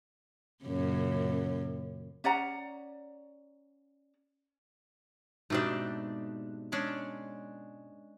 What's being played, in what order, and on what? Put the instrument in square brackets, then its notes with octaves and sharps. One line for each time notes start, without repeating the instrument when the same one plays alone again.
[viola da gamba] F#2 A#2 C#3
[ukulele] C#4 D5 F#5 A#5
[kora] G#2 B2 G4 [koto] A3 C4 D4
[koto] G#3 C#4 D4